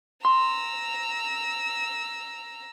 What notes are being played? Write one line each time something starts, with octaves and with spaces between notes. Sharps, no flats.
A#5 C6 E6